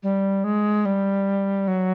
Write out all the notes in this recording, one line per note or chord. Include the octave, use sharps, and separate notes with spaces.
G3
G#3
G3
F#3